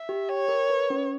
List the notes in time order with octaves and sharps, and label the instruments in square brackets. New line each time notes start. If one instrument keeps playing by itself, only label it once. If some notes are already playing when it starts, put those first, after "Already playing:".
Already playing: [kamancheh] E5
[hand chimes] G4
[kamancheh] C#5 [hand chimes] G5
[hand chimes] A#4
B4
C#4